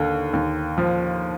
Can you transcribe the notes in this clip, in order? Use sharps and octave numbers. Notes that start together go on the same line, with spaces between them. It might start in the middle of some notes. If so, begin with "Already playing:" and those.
Already playing: D#2 D3
D#2
F3